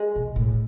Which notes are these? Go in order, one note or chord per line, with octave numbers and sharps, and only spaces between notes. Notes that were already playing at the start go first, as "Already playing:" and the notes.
Already playing: G#3
B2
A2